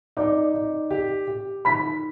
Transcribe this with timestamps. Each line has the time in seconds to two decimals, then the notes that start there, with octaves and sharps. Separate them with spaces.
0.17 D#4 D5 D6
0.54 D#4
0.91 G4
1.28 G4
1.65 D#3 B5 B6